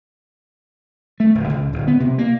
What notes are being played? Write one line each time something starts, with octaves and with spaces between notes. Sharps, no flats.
A3
D1
C#2
D1
B3
C3
A#3